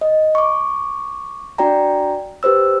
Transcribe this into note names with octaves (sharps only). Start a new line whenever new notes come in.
D#5
C#6 D6
D4 F#4 D5 G5 A#5
G4 B4 C5 E6